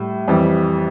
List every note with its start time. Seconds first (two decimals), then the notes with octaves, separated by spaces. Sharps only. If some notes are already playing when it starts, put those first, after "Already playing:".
Already playing: A2 G3
0.28 F2 E3 G3